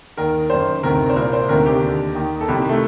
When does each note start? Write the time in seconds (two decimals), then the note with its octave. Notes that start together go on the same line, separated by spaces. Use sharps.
0.17 D#2 D#3 A#4
0.50 F#2 D#3 C5
0.83 D2 C3 D#3 A#4
1.10 C5
1.16 C2 A#2 A#4
1.33 C5
1.49 D2 C3 D#3 A#4
1.66 G4
1.82 D#2 D3
2.15 D#2 D#3
2.41 A4
2.48 C2 C3 D#3 G4
2.69 A3